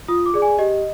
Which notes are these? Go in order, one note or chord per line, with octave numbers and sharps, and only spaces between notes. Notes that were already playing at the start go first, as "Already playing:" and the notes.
F4 D#6
D6
G#4 D5
G#5
G4 D#5